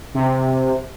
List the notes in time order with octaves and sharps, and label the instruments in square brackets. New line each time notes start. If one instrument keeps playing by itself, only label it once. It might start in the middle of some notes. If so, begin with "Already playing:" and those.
[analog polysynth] C3